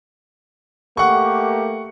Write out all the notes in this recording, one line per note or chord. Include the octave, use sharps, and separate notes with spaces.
A3 A#3 G4 F#5 C#6